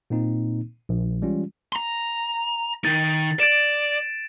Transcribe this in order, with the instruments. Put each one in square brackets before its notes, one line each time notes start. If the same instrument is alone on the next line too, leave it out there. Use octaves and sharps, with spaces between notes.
[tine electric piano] A#2 A#3 C4 D#4
A#1
E3 G3 G#3 C#4 F4
[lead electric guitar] A#5 C6
[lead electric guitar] D#3 D#4 [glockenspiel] A6
[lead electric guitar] D5 [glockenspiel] A6 D7 E7